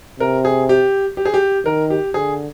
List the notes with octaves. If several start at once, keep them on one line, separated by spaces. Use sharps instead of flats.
C3 A#4
G#4
G4
G4
G#4
G4
D#3 A#4
G4
D3 G#4